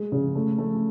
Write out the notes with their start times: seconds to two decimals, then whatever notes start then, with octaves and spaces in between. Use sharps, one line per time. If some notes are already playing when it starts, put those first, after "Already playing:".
Already playing: G#3
0.12 C#3
0.35 A3
0.58 A3